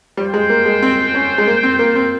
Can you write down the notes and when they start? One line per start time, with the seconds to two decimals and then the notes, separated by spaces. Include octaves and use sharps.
0.17 G3 F4 C5 G5
0.34 G#3
0.50 A#3
0.66 G#3
0.82 C4
1.15 C#4
1.38 G#3
1.47 A#3
1.63 C4
1.79 A#3
1.96 C4